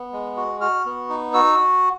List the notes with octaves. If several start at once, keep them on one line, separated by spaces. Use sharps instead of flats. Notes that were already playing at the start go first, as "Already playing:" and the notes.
Already playing: B3
G#3
F#4
F#4 F6
B3
D#4
F#4 E6